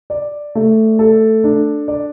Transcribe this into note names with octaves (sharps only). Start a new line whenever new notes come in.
D5
A3
A4
D4
D5